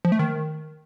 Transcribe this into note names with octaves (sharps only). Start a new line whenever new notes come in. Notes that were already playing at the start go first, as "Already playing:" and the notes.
F3
A3
D#3